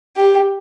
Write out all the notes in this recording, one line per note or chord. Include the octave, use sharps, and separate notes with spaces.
G4